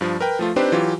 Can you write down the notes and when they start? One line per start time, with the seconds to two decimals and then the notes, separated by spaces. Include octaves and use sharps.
0.01 G2 F3
0.21 A#4 B4 G5
0.39 F3 A3 F4
0.56 C4 D4 D#4 G4 B4 C5
0.72 E3 F#3 F4 G4